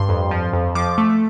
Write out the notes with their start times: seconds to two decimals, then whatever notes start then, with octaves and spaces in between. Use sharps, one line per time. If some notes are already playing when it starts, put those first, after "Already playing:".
Already playing: G2 C6
0.09 F2
0.31 F3
0.53 F2
0.75 F3 D6
0.98 A3